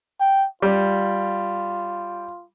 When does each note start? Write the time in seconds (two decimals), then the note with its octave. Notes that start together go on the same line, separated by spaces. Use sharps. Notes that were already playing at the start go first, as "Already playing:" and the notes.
0.21 G5
0.62 G3 F4